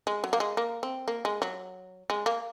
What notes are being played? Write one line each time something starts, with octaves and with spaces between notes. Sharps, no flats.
G#3
F#3
A#3
G#3
A#3
C4
A#3
G#3
F#3
G#3
A#3